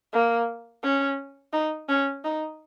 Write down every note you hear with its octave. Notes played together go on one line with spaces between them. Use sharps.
A#3
C#4
D#4
C#4
D#4